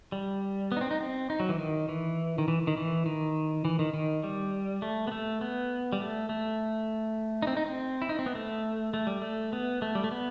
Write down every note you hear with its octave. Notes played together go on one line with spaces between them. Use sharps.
G3
B3
D#4
C4
D#4
C4
D#4
F#3
E3
D#3
E3
D#3
E3
D#3
E3
D#3
E3
D#3
D#3
G3
A3
B3
A3
B3
G3
A3
A3
D#4
C4
D#4
C4
E4
D#4
C4
B3
A3
A3
G3
A3
B3
A3
G3
A3
B3